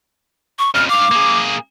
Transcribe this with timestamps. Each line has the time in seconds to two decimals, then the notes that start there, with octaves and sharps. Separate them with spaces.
0.59 C#6
0.74 F2 C#3 F6
0.89 G2 F5 D6
1.11 A#3 G#4